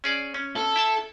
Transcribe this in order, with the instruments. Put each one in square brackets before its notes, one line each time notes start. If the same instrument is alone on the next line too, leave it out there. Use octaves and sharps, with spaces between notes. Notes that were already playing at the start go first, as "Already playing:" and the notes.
[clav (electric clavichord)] C#4 G#4 D5
C#4
[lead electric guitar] A4
[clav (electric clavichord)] E4 E5 A5